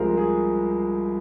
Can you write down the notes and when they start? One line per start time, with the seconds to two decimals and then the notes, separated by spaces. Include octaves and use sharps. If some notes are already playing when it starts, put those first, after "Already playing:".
Already playing: C2 C3 F3 G#3 A#4 C5
0.17 G#4